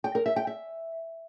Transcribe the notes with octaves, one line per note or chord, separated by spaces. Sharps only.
G5
A#4
E5
G5
E5